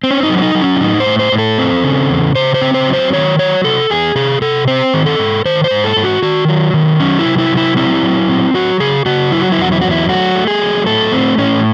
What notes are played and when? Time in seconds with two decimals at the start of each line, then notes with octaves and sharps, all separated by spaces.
0.04 C4
0.11 C#4
0.23 D#4
0.29 F#3
0.38 C#4
0.42 D#4
0.55 F#3
0.62 C#4
0.76 E4
0.81 A2 D#4
1.00 C5
1.06 A2
1.19 C5
1.32 A2
1.38 A4
1.58 C4
1.84 C#3
2.10 E2
2.35 C#3 C5
2.54 C5
2.61 C4
2.74 C5
2.87 F#3
2.93 C5
3.13 D#3 C#5
3.39 F#3 C#5
3.64 C3 A4
3.90 E2 G#4
4.15 C3 G#4
4.41 C3 A4
4.68 C4 C5
4.94 D#3
5.06 A4
5.19 G#2
5.45 D#3 C5
5.64 C5
5.71 G#2
5.84 A4
5.97 G#2
6.04 F#4
6.22 D#3 F#4
6.48 F#3
6.74 D#3
7.00 F#3 C#4
7.19 E4
7.25 C3
7.38 E4
7.51 F#3
7.57 E4
7.77 C4 E4
8.03 F#3
8.28 C4
8.54 F#3 F#4
8.80 C#3 G#4
9.06 C#3 F#4
9.31 F#3 E4
9.42 F#4
9.52 E4
9.58 E2 F#4
9.72 E4
9.81 F#3 F#4
9.91 E4
10.09 A3 F#4
10.35 A3
10.47 G#4
10.60 F#3
10.86 A2 A4
11.12 A3 C4
11.38 A2 C#4